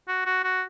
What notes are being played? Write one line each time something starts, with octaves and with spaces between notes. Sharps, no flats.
F#4
F#4
F#4